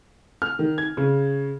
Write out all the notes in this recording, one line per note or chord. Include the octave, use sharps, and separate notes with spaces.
F6
D#3
G#6
C#3